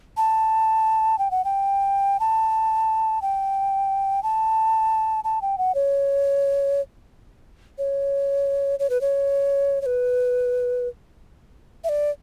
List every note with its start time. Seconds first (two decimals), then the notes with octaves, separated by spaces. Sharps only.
0.17 A5
1.19 G5
1.31 F#5
1.45 G5
2.20 A5
3.22 G5
4.23 A5
5.24 A5
5.42 G5
5.58 F#5
5.75 C#5
7.78 C#5
8.79 C#5
8.90 B4
9.01 C#5
9.82 C#5
9.86 B4
11.84 E5
11.89 D5